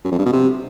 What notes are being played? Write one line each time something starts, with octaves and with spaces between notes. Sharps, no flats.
F#2
F2
G2
B2
C3